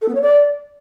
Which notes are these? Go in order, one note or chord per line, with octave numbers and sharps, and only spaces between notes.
A4
B3
C#5
D5